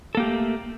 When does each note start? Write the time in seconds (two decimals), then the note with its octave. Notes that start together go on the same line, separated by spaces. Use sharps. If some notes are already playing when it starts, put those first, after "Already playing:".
0.15 A4
0.17 A#3
0.20 G4
0.22 A3